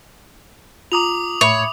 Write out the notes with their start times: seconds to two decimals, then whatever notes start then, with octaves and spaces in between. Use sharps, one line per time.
0.92 F4 A#5 D6 D#6 F7
1.41 A2 C#5 E5 B5